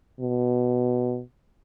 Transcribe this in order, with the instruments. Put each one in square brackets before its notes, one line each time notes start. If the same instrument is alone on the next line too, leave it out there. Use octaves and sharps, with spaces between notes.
[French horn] B2